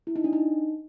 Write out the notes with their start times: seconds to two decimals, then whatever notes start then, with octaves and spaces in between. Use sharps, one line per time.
0.07 E4
0.16 D#4
0.24 D4
0.33 D#4